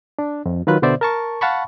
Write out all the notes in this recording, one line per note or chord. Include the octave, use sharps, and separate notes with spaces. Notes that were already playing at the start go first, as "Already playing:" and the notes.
D4
F2
D#3 F#3 F4 B4 F#6
B2 D3 B3 C5 D5 E5
A#4 A5 C#6
F5 F#5 A5 B5 C#6